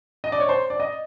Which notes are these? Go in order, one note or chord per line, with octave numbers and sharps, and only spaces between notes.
D#5
D5
C#5
C5
D5
D#5